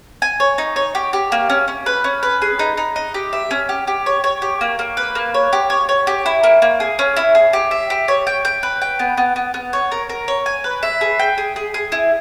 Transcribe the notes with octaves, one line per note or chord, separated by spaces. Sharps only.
G#5
C#5
D#4
C#5
G4
G4
A#3
C#4
C#4
B4
C#4
B4
G#4
D#4
D#4
D#5
G4
E5
C#4
G4
G4
C#5
C#5
G4
A#3
A#3
B4
A#3
C#5
G4
C#5
C#5
G4
E4
A#3
A#3
G#4
C#4
E4
G#4
G4
E5
G4
C#5
G5
G5
B4
G5
B3
B3
B3
B3
C#5
A#4
A#4
C#5
G#5
B4
E5
G#4
G5
G#4
G#4
G#4
E4